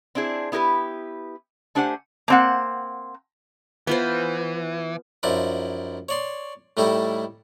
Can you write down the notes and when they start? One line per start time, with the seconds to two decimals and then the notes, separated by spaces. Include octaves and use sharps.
0.15 C4 D4 E4 G#4
0.52 B3 E4 G4 A#4 B4
1.75 A3 D4 G4 C5 F#5 G#5
2.28 A#3 C4 F#5
3.87 E3 B3 F4 C5
5.23 F#2 F3 D#4 E4 D5
6.09 C#5 D5 C6
6.77 A2 G3 A3 D#4 E4 A4